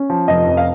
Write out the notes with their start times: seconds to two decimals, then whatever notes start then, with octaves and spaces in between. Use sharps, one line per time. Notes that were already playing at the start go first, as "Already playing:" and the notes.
Already playing: C#4
0.10 F3
0.28 F1 D#5
0.47 F2
0.57 F5